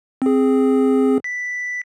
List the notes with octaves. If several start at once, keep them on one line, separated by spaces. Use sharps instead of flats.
C4 G#4
B6